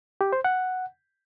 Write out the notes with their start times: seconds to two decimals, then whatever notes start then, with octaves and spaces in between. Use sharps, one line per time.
0.21 G4
0.33 C5
0.44 F#5